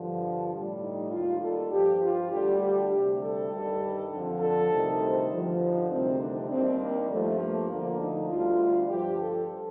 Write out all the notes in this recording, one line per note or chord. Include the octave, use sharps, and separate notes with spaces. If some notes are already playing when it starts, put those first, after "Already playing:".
Already playing: G2 D3 F3
A2 G3
D#4
D#2 D#3 G3 F4
A4
G2 F3 G4
F4
D2 D3 G3 G4
G4
D2 C3 G3
A4
G2 D#3 G3
F2 D3 F3
A4
D2 C3 D#3 G3
C5
G2 D3 F3
D#4
D2 C3 D#3 G3 C4
D4
D#2 D#3 G3 C4
A#3
G2 F3 A3
A#3
D2 D3 F3 A#3
D#4
D2 D3 G3 F4
G2 F3 G4
A4